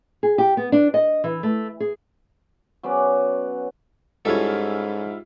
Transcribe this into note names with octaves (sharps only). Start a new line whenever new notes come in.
G#4
G4
B3
D4
D#5
E3
A3
G#4
F#3 B3 C#4 D5
G#2 G3 C#4 E4 F4 A4